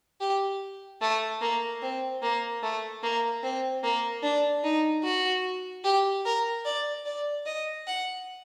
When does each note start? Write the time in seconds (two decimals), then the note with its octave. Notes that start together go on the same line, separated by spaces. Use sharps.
0.20 G4
1.01 A3
1.41 A#3
1.82 C4
2.22 A#3
2.62 A3
3.03 A#3
3.43 C4
3.83 A#3
4.23 D4
4.63 D#4
5.04 F#4
5.84 G4
6.25 A#4
6.65 D5
7.05 D5
7.46 D#5
7.87 F#5